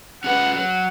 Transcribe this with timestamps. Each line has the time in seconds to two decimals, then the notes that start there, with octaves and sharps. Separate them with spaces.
0.23 C#4 G#4 B4 F#5
0.53 F#3 F#5